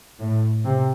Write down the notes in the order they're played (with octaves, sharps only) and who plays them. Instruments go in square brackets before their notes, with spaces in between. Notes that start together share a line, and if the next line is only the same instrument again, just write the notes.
[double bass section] A2
C3